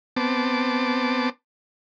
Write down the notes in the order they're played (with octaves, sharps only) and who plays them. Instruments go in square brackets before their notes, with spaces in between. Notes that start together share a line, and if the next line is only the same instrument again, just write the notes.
[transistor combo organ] B3 C4 A5 D6